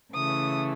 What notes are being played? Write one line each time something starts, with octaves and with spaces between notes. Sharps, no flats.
C#3 E3 A3 D#6